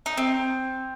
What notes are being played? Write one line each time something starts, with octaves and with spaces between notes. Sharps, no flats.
D#4
C4